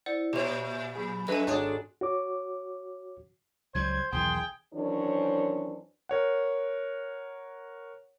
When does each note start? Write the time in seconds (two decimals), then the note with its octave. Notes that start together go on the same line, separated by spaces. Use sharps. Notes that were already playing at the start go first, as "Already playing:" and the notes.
0.06 E4 C5 D5 F#5
0.33 A#2 G4 C#5 E5 C6 F7
0.95 F#3 G#4 B5
1.28 F#2 A4 B4 D#5 E5 G#5
1.47 G#1 D4 F#4 G#4 A4 C#5 D#6
2.01 F#4 C#5 D6
3.75 C#2 F#3 G3 C5 G#6
4.12 B1 E2 D#3 G#4 G5 C6
4.74 F#2 D#3 E3 D4 C5 C#5
6.09 A#4 C#5 F#5